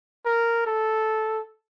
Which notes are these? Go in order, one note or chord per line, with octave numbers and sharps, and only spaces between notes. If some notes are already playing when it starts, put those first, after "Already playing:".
A#4
A4